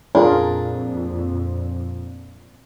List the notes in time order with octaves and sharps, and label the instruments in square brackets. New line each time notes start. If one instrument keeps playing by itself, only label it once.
[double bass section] F2 A#2 [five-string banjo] D4 [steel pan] F4 G#4 A#4